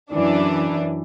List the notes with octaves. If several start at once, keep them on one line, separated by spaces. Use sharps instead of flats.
F#2 E3 D4